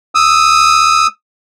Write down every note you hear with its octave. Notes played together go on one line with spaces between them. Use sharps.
D#6 E6